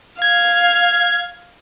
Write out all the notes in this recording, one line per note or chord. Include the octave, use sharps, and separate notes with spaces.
F5 G#6